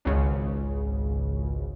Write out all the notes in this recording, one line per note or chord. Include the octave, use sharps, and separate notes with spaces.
G#1 C#2 C#3